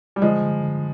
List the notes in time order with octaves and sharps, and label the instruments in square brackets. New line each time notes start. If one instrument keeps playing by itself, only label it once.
[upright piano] G3
[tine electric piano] D3 [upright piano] F3 G#3
[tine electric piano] D3
D3